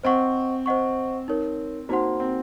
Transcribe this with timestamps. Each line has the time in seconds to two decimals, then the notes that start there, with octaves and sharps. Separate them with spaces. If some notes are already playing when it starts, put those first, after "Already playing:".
0.04 C4 C5 D#5 F#5 C#6
0.66 C5 D#5 F#5 C#6
1.28 D#4 A#4 C#5
1.89 A#3 D#4 F#4 C5 F#5 C6
2.20 C4